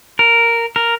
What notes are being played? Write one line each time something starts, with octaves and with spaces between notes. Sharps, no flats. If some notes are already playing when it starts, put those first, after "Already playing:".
A#4
A#4